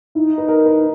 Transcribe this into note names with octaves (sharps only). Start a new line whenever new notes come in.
D#4 E4
B4
A#4
B4